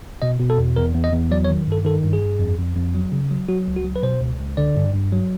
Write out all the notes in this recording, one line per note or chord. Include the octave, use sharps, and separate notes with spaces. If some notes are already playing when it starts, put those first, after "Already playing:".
B2 D#5
B2
A4
E2
E2 A#4
E2
D#5
E2
F#3 D5
C#5
D#3
G2 A4
D#3 A4
G2
G#4
G2
F2
F2
F2
F#3
C#3
F#3
F#3 F#4
C#2
F#4
F#3
B4
B2 C5
C#2
C#2
D3 D5
G2
G2
F#3